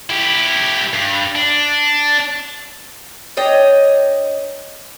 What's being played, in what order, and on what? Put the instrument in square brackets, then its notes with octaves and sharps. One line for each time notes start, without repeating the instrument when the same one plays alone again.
[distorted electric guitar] E4 G4
G2
D4
[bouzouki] D4 C#5 D#5 G5